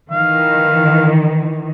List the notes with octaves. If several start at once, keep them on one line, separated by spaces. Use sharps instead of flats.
D#3 E3 F5